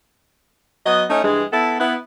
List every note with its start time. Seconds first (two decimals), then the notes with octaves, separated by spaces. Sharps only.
0.85 F#3 B3 D#5
1.09 A3 C#4 D#4
1.23 G2 E3 G#3
1.52 B3 E4 A4
1.79 B3 E4